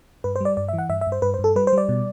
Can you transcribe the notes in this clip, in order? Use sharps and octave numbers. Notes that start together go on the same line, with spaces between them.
G2 B4
C5
G3 D5
G2 D5
E5
E3
F#5
G2 E5
E5
G2
C5
G2 B4
C5
G2
A4
G3 B4
C5
G3 D5
B2